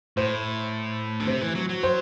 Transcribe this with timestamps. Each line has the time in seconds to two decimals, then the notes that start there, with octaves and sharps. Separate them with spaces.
0.17 A2 C5
1.20 D3
1.27 C3 C5
1.41 E3
1.55 F#3
1.69 F#3
1.83 C5